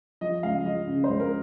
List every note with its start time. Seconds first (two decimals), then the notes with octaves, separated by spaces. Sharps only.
0.21 F3 D#5
0.43 C#2 F5
0.65 F3 D#5
0.87 C#3
1.04 C5
1.09 C#2
1.20 A#4